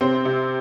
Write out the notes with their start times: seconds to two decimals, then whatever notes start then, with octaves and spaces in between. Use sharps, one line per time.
0.01 C3 C4
0.25 C3